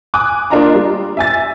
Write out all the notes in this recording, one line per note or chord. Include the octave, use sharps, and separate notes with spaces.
G#5 D6 D#6 F#6
A#3 D4 F4 D#5 A#5 C6
G3
E5 G#5 A6